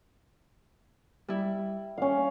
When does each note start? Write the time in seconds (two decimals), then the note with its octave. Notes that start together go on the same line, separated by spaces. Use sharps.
1.28 G3 E4
1.98 C#4 F5